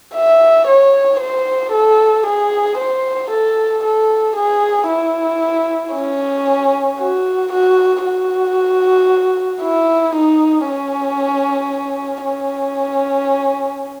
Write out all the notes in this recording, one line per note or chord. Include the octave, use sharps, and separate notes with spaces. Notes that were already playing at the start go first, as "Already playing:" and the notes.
E5
C#5
C5
A4
G#4
C5
A4
A4
G#4
E4
C#4
F#4
F#4
F#4
E4
D#4
C#4
C#4